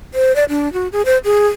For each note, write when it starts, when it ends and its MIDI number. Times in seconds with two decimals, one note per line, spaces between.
0.14 0.35 72
0.36 0.44 74
0.49 0.72 62
0.73 0.88 66
0.93 1.02 68
1.05 1.18 72
1.25 1.47 68